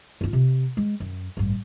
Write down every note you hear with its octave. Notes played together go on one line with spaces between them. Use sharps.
G2 F4
C3
G#3
F#2
A1 G2